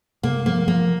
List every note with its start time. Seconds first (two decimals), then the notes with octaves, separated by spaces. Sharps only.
0.23 C3 A#3
0.46 F3 A#3
0.67 F3 A#3